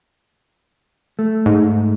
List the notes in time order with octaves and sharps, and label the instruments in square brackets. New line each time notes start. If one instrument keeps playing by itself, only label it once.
[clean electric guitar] A3
[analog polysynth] G#2